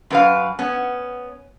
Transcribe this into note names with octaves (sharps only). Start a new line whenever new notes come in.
F#2 B4 F5
B3 C#4